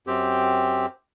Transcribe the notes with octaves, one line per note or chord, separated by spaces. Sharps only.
F#2 C4 G4